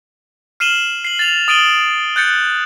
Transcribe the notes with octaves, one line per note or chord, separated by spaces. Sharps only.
F6 C7 D#7 E7 F#7 G7
C7 F#7
A6 F7
D#6 A6 D7 D#7 F#7 G7
F#6 G6 A6 C#7